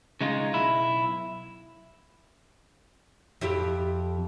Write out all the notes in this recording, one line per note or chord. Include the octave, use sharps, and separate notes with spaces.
C#3 G#3 D#4 F4
B1 E4
F2 E4 G4